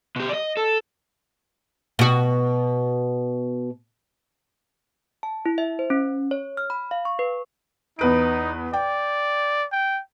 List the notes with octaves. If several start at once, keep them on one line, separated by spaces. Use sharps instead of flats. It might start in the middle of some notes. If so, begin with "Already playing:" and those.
B2 G4
D5 D#5
A4
B2 F#4
A5
E4
E5
C5
C#4
C#5
F6
B5
F5
C#6
B4
E2 D#4 B4 D7
D5 G5
G5